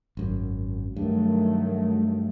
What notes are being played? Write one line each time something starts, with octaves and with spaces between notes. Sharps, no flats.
G#1 F#2
G2 D#3 F#3 A3